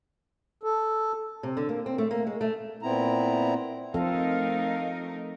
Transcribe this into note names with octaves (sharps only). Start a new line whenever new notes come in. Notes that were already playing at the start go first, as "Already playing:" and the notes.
A4
C3
D3
A#3
C4
A3
A#3
G#3
A3
A#2 B3 C4 E4 A#5
F3 A3 C4 D#4 A4 A#4 F5